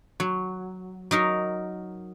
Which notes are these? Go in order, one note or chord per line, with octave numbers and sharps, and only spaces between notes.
F#3
F#3 D#4 A#4